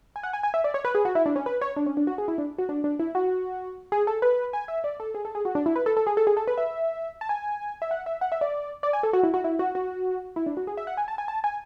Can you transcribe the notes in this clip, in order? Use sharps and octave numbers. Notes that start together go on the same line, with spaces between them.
G#5
F#5
G#5
G#5
E5
D5
C#5
B4
G#4
F#4
E4
D4
C#4
B4
C#5
D4
C#4
D4
F#4
G#4
E4
D4
F#4
D4
D4
E4
F#4
G#4
A4
B4
G#5
E5
D5
A4
G#4
A4
G#4
F#4
D4
E4
B4
A4
A4
G#4
A4
G#4
A4
B4
E5
A5
G#5
E5
F#5
E5
F#5
E5
D5
D5
G#5
A4
F#4
E4
F#4
E4
F#4
F#4
E4
D4
F#4
G#4
E5
F#5
G#5
A5
G#5
A5
G#5